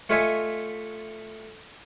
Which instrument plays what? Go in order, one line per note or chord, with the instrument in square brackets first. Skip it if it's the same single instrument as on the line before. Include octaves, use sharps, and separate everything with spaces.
[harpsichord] A3 F4 C#5 D#5 E5 G#5